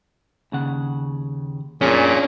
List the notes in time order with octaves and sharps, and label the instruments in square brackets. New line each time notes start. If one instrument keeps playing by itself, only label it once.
[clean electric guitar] D#2 C#3 F#5
[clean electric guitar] F#2 [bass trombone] A#2 [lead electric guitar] C#4 D4 [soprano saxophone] G#4